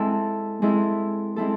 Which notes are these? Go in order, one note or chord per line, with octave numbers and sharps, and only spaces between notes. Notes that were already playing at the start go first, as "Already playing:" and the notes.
Already playing: G#3 C4 E4 A4
G#3 C4 E4 A4
G#3 C4 E4 A4